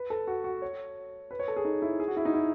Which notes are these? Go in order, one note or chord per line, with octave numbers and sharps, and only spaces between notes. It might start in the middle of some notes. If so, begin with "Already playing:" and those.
Already playing: B4
A4
F#4
F#4
C#5
B4
C#5
A4
G#4
D#4
E4
G#4
F#4
E4
D#4
E4